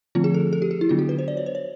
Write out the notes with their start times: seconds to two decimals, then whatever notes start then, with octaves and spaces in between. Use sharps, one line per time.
0.15 D3 F3 A3 C4 F4
0.24 G#4
0.34 A4
0.53 A4
0.62 G4
0.71 G#4
0.81 E4
0.89 D3 F#3 B3 D4 F4
0.99 F#4
1.09 B4
1.19 C5
1.28 D5
1.37 C#5
1.46 C5
1.55 C#5